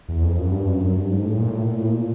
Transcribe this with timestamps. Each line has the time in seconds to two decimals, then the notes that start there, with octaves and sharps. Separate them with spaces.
0.09 E2
0.23 F2
0.38 F#2
0.51 G2
0.67 F#2
0.81 F#2
0.96 G2
1.11 G#2
1.25 A2
1.38 A#2
1.50 A2
1.64 A#2
1.75 A2
1.88 A#2